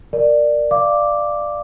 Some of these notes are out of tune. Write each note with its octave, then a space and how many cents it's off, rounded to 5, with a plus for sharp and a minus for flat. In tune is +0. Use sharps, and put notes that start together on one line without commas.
A#4 +0 D5 +10
D5 +10 F5 -15 D6 +0